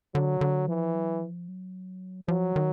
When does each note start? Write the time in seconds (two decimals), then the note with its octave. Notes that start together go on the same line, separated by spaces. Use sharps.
0.15 D3 F#3
0.41 D3
0.68 E3 F3
0.95 F#3
1.22 F3
1.48 F#3
2.28 F3 F#3
2.56 D#3